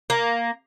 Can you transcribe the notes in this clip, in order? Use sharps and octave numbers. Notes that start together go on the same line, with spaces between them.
A#3